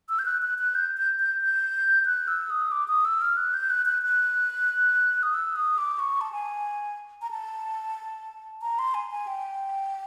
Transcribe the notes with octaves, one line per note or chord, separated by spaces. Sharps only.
E6
G6
F#6
F#6
F#6
G6
G6
G6
G6
F#6
E6
D#6
D6
D#6
E6
F6
F#6
G6
F#6
F#6
F#6
D#6
E6
D#6
D6
C#6
A5
G#5
A#5
A5
A#5
C6
G#5
G#5
G5